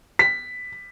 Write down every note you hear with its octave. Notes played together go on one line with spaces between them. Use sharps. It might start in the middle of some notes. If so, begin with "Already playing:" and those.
B6